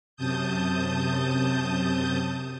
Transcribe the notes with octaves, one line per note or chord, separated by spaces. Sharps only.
F#2 C3 A5 D#6 G6